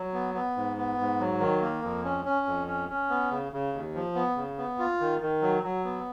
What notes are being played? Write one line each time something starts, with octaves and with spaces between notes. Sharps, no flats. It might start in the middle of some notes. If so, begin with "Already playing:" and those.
Already playing: F#3
B3
B3
G#2
B3
G#2
F#3
D#3
A#3
F2
C#4
C#4
F2
C#4
C#4
B3
C#3
C#3
D#2
F3
B3
C#3
B3
F4
D#3
D#3
F#3
F#3
B3